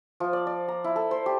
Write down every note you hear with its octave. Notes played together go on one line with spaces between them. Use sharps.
F3
D5
D5
A#5
E4
A4
C5
G4